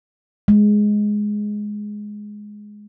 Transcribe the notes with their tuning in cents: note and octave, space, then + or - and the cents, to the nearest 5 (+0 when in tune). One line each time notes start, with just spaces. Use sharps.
G#3 +5